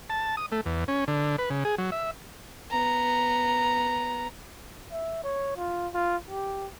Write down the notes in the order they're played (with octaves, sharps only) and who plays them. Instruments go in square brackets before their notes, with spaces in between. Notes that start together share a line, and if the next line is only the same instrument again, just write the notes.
[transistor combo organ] A5
D#6
A3
E2
C#4
D3
B4
C#3
G#4
F#3
E5
[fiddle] B3 A#5
[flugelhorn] E5
C#5
F4
F4
G4